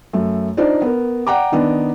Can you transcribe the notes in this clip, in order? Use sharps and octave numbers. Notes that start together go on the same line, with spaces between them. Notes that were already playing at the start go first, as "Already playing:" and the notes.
F#2 A3
D4 D#4 F4 C5 D5
B3 A#4
D5 F#5 G5 A#5 D6
D#3 B3 D4 D#4